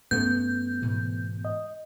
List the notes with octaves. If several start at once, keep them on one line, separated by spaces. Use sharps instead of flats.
G2 A3 B3 C#4 G6
G#2 B2 E3
D#5